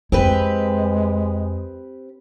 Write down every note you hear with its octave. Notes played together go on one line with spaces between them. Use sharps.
F2 G#3 C4 E4 G4 B4